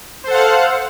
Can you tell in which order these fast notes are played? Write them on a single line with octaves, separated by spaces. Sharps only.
C5 A4 F#5 F5